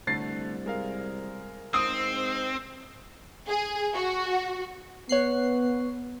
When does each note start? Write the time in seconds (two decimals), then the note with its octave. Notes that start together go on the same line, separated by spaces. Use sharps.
0.07 C2 D3 A3 A6 C7
0.66 G#3 A#4 F5
1.74 G#2 C4 D#6
3.47 G#4
3.94 F#4
5.09 B3 C#5 F#6 C7